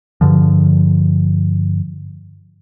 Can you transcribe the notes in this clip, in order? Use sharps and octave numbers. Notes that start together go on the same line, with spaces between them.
G2 D3 F3